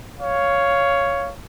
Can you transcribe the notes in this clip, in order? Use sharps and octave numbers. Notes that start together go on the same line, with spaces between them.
C#5 F5